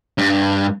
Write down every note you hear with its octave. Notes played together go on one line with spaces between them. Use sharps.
G2